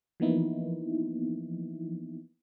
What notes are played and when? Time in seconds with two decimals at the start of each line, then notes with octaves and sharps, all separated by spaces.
0.20 E3 F3 A#3 B3 D#4 E4